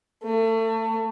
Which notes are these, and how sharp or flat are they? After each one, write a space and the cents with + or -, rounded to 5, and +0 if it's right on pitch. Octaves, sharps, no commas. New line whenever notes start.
A3 +30